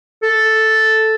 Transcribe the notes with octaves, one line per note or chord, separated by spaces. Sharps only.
A4